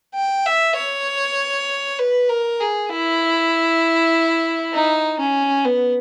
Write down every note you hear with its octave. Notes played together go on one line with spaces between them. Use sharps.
G5
E5
C#5
B4
A#4
G#4
E4
D#4
C#4
B3